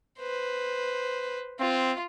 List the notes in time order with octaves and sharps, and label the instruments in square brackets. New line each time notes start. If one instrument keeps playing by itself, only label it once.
[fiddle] B4 C5
[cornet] C4 [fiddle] F4